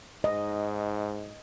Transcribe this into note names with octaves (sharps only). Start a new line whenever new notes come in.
G#2 D#5